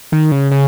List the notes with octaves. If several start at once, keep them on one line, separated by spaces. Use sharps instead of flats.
D#3
C#3
C#3